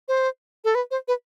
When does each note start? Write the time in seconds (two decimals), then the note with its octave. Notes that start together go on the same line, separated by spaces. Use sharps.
0.08 C5
0.65 A4
0.75 B4
0.91 C5
1.08 B4